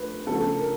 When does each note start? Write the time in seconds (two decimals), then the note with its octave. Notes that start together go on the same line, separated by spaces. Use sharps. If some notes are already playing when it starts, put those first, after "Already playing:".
Already playing: F3 A3 B4
0.26 C#3 F3 A3 A4
0.57 A#4